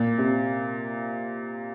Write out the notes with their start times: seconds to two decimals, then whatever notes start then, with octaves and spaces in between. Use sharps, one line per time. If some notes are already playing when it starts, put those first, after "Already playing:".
Already playing: A#2
0.18 C3